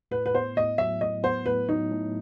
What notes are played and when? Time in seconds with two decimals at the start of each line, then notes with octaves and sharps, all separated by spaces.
0.11 A2 B4
0.26 B4
0.34 B3 C5
0.57 A2 D#5
0.78 F#3 E5
1.01 A2 D#5
1.23 B3 C5
1.46 A2 B4
1.69 F#3 D#4
1.91 A2